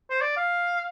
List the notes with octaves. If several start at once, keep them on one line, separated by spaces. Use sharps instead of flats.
C5
D5
F5